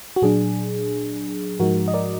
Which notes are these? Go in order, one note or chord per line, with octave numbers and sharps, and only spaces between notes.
F#4
A#2 F#3 D4 G#4
G#2 F3 G#3 D#4 F#4 A#4
D#5
A#4 D5